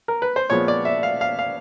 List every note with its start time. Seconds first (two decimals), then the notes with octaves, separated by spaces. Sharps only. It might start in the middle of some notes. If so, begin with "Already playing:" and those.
0.08 A#4
0.22 B4
0.36 C5
0.50 A#2 F3 G#3 B3 C#5
0.68 D5
0.85 E5
1.03 F5
1.21 F5
1.39 F5